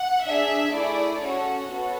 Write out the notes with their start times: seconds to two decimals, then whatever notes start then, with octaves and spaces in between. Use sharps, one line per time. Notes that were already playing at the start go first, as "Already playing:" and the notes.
Already playing: F#5
0.26 D4 G#4 E5
0.73 A3 E4 G#4 D5
1.21 C#4 F#4 A4 C#5
1.67 B3 F#4 A4 C#5